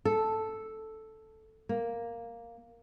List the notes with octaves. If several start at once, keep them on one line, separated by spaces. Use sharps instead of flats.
A4
A#3